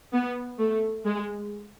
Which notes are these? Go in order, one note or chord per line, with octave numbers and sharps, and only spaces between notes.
B3
A3
G#3